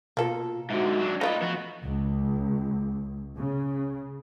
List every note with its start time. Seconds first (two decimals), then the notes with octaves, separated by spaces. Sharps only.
0.17 B2 A#3 F4 A4
0.70 G#2 D3 F#4 E5
0.99 F#3 D4
1.21 A3 D#4 F4 B4 D#5
1.42 F3 B3 F#4
1.84 C#2
3.37 C#3